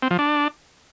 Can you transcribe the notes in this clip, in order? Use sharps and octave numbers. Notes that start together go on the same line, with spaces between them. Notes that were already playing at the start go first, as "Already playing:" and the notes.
C4
F3
D4